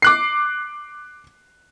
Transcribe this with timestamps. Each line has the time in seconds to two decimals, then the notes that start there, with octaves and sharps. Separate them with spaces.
0.02 D6 F#6 C7